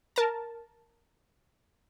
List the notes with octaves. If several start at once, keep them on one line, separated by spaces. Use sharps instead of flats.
A#4 A5